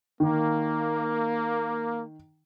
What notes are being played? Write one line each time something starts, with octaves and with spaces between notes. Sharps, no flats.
D#3 A#3